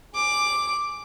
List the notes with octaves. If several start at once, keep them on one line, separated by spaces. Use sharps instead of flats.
G#4 D6